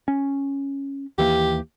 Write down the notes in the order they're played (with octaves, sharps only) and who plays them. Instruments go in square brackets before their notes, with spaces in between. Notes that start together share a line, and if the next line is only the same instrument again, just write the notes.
[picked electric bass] C#4
[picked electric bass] D#2 E3 A#3 [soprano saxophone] G4